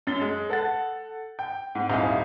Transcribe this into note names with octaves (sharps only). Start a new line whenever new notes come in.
F#2 A6 G7
G#3
A4 F#5 A6
G5
G#2 C4
D#1 C4 D#4 E4 F5 G#5